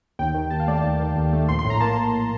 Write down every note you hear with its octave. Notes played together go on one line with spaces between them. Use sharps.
D#2 G5
D#3
D#2 A5
F5
A3 D5
A5
D#2
D#3
D#2
A3
A#1 C6
C6
A2
A#5
A#3 A5